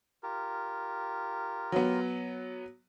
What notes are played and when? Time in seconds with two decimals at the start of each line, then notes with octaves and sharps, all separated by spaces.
0.23 F4 G4 A#4
1.72 F#3 B3